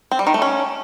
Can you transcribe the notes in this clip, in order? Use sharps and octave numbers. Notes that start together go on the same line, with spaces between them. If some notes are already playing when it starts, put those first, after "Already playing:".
C4
G3
D#3
A3
C#4